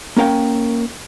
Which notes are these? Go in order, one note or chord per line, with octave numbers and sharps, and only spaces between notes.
A#3 C#4 A#4 F5 G5